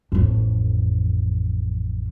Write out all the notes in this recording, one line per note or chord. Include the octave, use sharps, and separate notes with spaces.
A1 F2